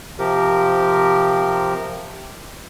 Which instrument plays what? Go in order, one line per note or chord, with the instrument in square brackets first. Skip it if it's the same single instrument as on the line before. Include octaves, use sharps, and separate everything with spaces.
[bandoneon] C3 F3 G4 A#4